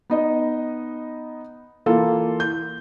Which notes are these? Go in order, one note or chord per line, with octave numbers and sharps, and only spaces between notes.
B3 D#4 D#5
E3 A#3 F4 A4
G6